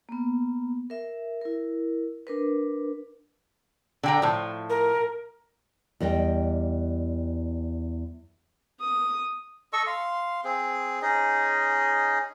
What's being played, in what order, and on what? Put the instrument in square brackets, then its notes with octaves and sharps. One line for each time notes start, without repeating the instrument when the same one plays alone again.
[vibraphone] A#3 B3
A#4 E5
E4 A#4
D4 A#4 B4
[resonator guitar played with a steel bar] D3 G5 A#5
A2 F3
[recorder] A#4
[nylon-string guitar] E2 G3 D#5 G5
[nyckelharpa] D#6
[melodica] A4 D#5 C#6 E6
F5 C6
C4 G#4
C#4 D#4 G#4 D#5